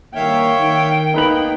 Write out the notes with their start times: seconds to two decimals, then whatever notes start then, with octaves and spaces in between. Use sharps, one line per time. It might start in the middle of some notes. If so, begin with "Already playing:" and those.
0.15 G2 D#3 A#3 C#5 E5 F5 G5
0.58 D#3
1.14 A#3 B3 D#4 B4 F#7